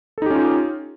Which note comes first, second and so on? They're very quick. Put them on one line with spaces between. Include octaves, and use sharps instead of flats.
A4 D#4 G4 C#4 F4